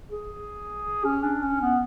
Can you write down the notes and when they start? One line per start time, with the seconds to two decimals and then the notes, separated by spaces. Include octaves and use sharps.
0.11 G#4
1.05 C#4
1.24 D4
1.42 C#4
1.61 B3